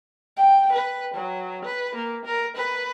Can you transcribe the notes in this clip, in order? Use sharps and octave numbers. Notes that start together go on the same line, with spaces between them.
G5
B4
F#3
B4
A#3
A#4
B4